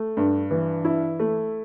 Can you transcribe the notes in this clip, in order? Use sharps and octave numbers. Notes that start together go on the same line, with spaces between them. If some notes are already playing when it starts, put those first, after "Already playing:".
Already playing: A3
G2
E3
E4
A3